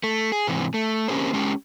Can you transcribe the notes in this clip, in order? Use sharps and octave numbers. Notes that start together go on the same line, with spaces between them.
A3
G#4
G#2 C3 E3
A3
A#3 C4 C#4 G4 A4 C5
G#3 C#4 G4